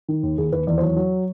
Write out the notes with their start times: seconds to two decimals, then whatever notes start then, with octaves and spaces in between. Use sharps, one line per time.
0.08 D#3
0.23 D#2
0.38 D#2 G#4
0.52 D#2 B4
0.67 E2 D5
0.78 C5
0.82 F#3 C#5
0.96 F#3